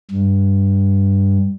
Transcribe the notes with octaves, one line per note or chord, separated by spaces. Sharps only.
G2